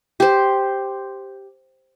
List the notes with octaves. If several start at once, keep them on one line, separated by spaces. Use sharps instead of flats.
G4 C5